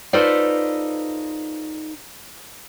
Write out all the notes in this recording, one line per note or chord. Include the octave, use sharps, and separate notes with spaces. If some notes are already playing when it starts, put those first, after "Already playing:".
D#4 F4 A4 B4 C5 D5